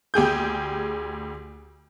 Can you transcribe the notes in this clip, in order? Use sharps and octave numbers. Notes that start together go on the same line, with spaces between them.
D2 G4 G#4 G6